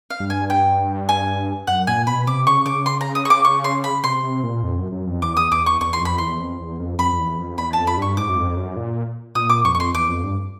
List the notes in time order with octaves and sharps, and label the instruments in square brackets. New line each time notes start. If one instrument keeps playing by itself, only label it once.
[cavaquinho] F5
[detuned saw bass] G2
[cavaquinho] G#5
G5
G#5
[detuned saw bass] F#2 [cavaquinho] F#5
[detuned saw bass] A#2 [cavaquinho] G#5
[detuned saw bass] B2 [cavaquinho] B5
[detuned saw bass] C3 [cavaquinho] D6
[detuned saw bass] C#3 [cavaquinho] C#6
[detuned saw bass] C#3 [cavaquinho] D6
[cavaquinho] C6
A#5
D#6
C#6
D6
C#6
C6
B5
[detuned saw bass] C3 [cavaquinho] C6
[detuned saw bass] C3
A#2
F2
F#2
F#2
F2
[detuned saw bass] E2 [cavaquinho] D6
[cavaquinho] D#6
[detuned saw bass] E2 [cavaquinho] D6
[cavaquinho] C#6
[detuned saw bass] E2 [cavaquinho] C#6
[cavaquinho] C6
[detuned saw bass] F2 [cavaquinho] B5
[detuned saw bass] E2 [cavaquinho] C6
[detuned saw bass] F2
E2
F2
[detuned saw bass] F2 [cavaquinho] B5
[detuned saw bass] F2
E2
F2
[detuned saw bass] E2 [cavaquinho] B5
[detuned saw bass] F2 [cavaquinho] A5
[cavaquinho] B5
[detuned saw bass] G2 [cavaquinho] C#6
[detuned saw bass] G#2 [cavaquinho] D6
[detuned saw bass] F#2
F2
F#2
A#2
[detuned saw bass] A#2 [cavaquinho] D#6
[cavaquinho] D6
[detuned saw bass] F2 [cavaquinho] C#6
[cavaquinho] C#6
C6
[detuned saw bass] E2 [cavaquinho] D6
[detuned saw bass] F2
G2